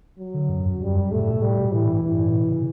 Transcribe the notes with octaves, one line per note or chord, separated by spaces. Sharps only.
F#3
D3
F#2
F#2
F#2 G3
F#2
G2 B2 A3
A2
B2
A2 G3
B2
A2 E3
G2
G2 E3
A2
B2
C#3